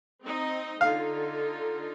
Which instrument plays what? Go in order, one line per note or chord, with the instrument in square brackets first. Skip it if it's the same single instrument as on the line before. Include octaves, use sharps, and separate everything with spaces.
[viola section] C4 D#4 D#5
[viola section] D3 D#4 F4 [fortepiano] F5